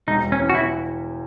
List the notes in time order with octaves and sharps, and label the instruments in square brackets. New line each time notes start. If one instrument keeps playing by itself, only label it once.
[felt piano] E1 [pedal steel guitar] D#4
[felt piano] E1
[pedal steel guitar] C#4
[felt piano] E2
[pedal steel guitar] F#4
[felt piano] E2 [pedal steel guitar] E4